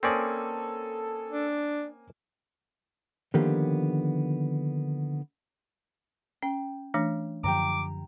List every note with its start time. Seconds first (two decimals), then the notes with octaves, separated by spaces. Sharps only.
0.03 A#3 C4 C#4 A4 D5 G#5 D#6
1.30 D4
3.34 D3 D#3 F3 A#3 B3 G4
6.42 C#4 G5
6.94 E3 A3 D4
7.44 F#2 D3 F3 G4 G5 A#5 D6